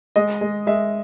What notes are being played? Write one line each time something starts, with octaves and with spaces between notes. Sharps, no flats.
G#3 D#5
G#3
G#3 E5